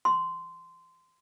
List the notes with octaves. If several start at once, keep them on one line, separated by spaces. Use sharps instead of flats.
C6